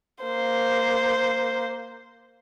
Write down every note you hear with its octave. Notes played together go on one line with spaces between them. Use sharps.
A#3 C5